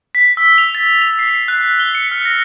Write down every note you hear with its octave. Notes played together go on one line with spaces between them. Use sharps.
B6
E6
F7
A6
A6
F7
C7
F#6
G7
C#7
F6
A#6